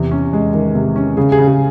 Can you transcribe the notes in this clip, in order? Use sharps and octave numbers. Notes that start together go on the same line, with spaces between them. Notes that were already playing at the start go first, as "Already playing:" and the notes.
Already playing: E2 C3
C#4
G#3
D#3
C3
C#4
C#3 G#4
G#4
C#3
G#4